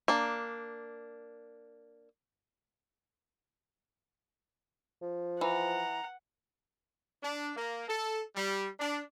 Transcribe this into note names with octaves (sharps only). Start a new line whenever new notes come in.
A#3 D4
F3
E3 F#5 A#5
D4
A#3
A4
G3
D4